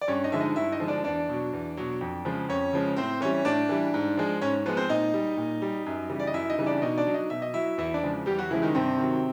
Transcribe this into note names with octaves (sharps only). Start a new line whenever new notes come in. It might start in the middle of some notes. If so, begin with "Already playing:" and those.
D5
G2 C#4 C#5
D#4 D#5
D3 F3 G#3 E5
D#4 D#5
G2 E4 E5
D#4 D#5
D3 F3 G#3
D4 D5
E2 D4 D5
B2 F#3
E2
B2 F#3
F2
C#3 F3 G#3
F2 C#4 C#5
C#3 F3 G#3
A2 C4 C5
E3 G3 C#4 C#5
A2 D4 D5
E3 G3
G#2
F3 G#3
G#2 C#4 C#5
F3 G#3 B3 B4
C4 C5
A#2 D#4 D#5
G3
A#2
G3
F#2
C#3 E3 G3
D5
D#5
F#2 E4 E5
D#4 D#5
C#3 E3 G3
D4 D5
B2 D#4 D#5
D4 D5
F#3
D#4 D#5
B2 E5
D#5
F#3 E4 E5
E2 E4 E5
D4 D5
C#3 F3 G#3
E2 G3 G4
F#3 F#4
C#3 E3 F3 G#3 E4
D#3 D#4
G2 C3 C4
D#3 F#3